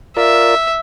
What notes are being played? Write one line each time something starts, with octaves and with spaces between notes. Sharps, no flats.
F4 A#4 D5 E5